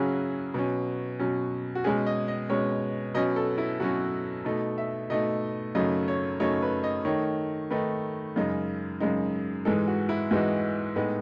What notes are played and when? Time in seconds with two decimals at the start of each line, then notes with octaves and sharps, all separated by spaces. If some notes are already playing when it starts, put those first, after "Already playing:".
Already playing: C#3 F#3 C#4 E4 F#4 G#4
0.54 B2 F#3 C#4
1.19 B2 F#3 C#4
1.75 F#4
1.84 B2 G#3 C#4 G#4
2.06 D#5
2.28 D#5
2.49 B2 G#3 C#4 C#5
3.14 B2 F#3 C#4 D#5
3.36 A4
3.58 E4
3.80 B2 F#3 C#4 F#4
4.44 B2 A3 D#4
4.78 E5
5.10 B2 A3 D#4 D#5
5.75 F#2 C#3 F#3 A3 D#4 D#5
6.08 C#5
6.40 F#2 C#3 F#3 A3 D#4 C#5
6.62 B4
6.84 D#5
7.05 D#3 A3 D#4 C#5
7.70 D#3 A3 D#4 B4
8.36 F#2 C#3 G#3 D#4
9.00 F#2 C#3 G#3 D#4
9.65 G#2 E3 G#3 D#4 A4
9.88 F#4
10.09 E4
10.31 G#2 E3 G#3 D#4 F#4
10.96 A2 G#3 B3 D#4